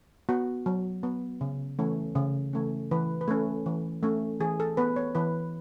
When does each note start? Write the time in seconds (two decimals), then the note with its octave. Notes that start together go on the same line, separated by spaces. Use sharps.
0.29 B3 F#4
0.66 F#3
1.03 B3
1.41 C#3
1.79 E3 A3 C#4
2.15 C#3
2.53 E3 A3 C#4
2.91 E3 B4
3.21 B4
3.28 A3 C#4 A4
3.66 E3
4.03 A3 C#4
4.40 E3 G#4
4.60 A4
4.77 B3 B4
4.96 C#5
5.15 E3 B4